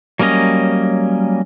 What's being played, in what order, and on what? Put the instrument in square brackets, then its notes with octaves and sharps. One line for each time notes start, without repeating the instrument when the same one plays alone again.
[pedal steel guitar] F#3 G3 A#3 C#4 D#5